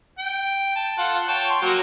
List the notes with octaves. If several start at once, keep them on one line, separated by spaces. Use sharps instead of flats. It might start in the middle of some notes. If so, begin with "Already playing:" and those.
G5
A5
F4 A4 F#5
C#5 G5 A5
C6
F#3 A#3 F#4